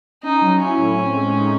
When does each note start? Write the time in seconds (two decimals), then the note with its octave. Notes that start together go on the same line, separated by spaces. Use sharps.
0.23 C#4 D#4
0.42 F#3
0.59 C#4 E4
0.78 A2
0.96 C4
1.14 G#3
1.33 D#4